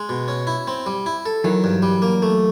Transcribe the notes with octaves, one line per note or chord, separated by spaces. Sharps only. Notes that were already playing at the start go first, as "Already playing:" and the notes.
Already playing: G#3
B2
C#4
E4
C4
G3
E4
A4
D#3 E3 F#3
G2
G3
A#3
A3